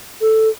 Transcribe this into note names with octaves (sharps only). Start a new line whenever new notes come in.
A4